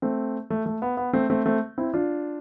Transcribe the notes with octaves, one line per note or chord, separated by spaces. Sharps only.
A3 C4
A3
A3
B3
B3
A3 C4
A3 C4
A3 C4
C4 E4
D4 F4